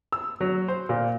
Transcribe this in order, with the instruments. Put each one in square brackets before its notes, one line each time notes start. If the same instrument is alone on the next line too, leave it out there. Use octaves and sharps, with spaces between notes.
[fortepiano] E6
F#3
C5
A#2